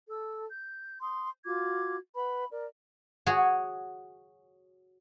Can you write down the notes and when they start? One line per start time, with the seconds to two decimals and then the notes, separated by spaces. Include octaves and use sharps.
0.10 A4 E6
0.49 G6
1.01 C6 D#6
1.45 F4 F#4 D6 G#6
2.15 B4 F#5 B5
2.51 A#4 D5
3.26 F#4 G#4 C#5